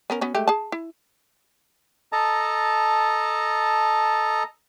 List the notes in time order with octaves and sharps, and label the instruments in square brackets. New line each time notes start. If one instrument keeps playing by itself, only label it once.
[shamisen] B3 C#4 A#4
B3 C#4 F#4
G#3 A3 G4
G#4 A5
E4
[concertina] A4 D#5 A5 A#5